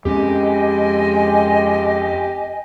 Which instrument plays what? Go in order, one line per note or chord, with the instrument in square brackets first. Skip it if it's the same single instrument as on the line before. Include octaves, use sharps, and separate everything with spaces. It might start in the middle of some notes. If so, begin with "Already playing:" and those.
[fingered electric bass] F2 C4 C#4 [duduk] G#3 [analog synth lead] G4 [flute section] D#5 G#5